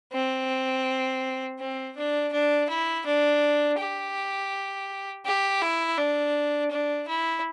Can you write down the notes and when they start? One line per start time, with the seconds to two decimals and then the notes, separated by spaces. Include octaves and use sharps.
0.12 C4
1.59 C4
1.96 D4
2.32 D4
2.69 E4
3.05 D4
3.78 G4
5.25 G4
5.61 E4
5.97 D4
6.71 D4
7.08 E4